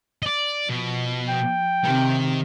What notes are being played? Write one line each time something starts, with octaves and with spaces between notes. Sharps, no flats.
D5 D#5
B2 F3
G5
C3 D#3